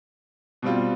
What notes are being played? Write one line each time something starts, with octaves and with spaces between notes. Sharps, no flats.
B2 G3 C4 F4